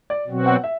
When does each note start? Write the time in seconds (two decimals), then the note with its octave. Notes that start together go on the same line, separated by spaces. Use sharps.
0.10 D5
0.27 B2 F#3 C4 F#4
0.46 F#5
0.64 E5